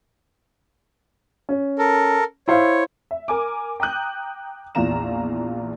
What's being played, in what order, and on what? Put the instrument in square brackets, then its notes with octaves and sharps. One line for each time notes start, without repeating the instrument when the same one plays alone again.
[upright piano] C#4
[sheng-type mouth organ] A4 A#4
[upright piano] E4 C5 F5 [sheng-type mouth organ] C#5
[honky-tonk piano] E5
A#4 G#5 D6
G5 A#5 D#6 F#6 G6
A#1 E2 E3 F4 A#5 E7